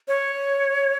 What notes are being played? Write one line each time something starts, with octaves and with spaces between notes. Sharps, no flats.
C#5